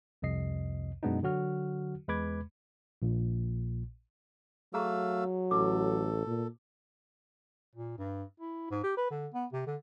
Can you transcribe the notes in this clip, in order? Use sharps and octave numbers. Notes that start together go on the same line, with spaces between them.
C2 F2 C3 D#5 C7
F#2 B2 G#3 B3 D4 D#4
D3 F#3 F#4 F6
E2 G#3 B4 B5 D6 G#6
A#1 A#2
F#3 A3 G#4 F5 A#5 C#6 E6
A1 A4 D6
A#2
A#2
G2
E4
G#2
G4
B4
D3
B3
C3
D3